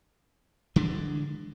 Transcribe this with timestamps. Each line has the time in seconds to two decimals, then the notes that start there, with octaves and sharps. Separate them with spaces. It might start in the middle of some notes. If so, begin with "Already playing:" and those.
0.76 D3 E3 G#3 D4